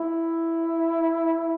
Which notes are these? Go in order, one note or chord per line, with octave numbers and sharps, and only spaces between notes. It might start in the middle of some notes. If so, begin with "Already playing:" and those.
Already playing: E4